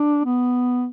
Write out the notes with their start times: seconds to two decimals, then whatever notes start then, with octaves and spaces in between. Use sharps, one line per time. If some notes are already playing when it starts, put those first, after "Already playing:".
Already playing: D4
0.25 B3